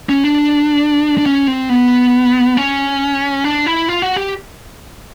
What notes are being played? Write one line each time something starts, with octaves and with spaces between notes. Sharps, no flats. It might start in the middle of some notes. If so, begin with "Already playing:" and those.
C#4
D4
D4
C#4
C4
B3
C#4
D4
E4
F4
F#4
G4